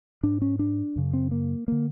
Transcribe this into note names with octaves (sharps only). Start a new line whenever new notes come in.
G#2 D4
C#4
D4
F#2 C#3
C4
A#3
D3 A#3